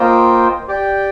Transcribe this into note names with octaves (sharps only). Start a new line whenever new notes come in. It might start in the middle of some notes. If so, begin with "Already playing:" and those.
Already playing: A#3 F4 C5 D#5 G5
G4 D5 G5